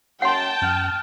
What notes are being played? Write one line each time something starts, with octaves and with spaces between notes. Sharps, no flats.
F#2 F#5 G5 A5 C6
F#2 F6